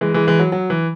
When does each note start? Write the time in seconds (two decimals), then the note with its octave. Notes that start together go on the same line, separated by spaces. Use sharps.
0.01 E3 G#3
0.14 E3 G#3
0.27 E3 G#3
0.39 F#3
0.52 F#3
0.70 E3